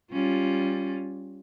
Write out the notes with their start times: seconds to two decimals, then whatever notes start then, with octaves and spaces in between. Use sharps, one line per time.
0.12 G3 C#4 F4